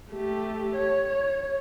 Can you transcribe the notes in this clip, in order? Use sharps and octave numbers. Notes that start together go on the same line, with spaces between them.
A3 G4
C#5